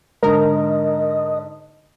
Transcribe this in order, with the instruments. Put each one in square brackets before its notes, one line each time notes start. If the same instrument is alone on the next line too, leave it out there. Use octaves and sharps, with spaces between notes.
[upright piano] G#2 D3 [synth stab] A#4 [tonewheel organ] D#5